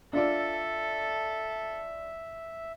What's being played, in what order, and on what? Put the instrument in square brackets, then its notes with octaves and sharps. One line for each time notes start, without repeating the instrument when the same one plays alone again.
[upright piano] D4 F4 D5 [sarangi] A4 [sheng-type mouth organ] E5